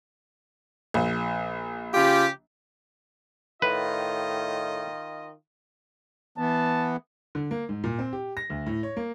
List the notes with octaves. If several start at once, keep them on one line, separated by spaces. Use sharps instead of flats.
A#1
C#3 F4 G4
A2 D#3 F4 B4 D#5
E3 B3 A5
D3
A#3
G#2
A#2
C4
G4
A#6
D2
A2
C#5
A#3